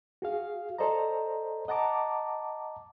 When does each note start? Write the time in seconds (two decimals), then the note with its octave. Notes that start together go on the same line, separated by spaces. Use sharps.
0.22 F#4 G#4 F5
0.78 A4 C5 D5 D#5 A#5
1.68 D#5 F#5 A5 A#5 D6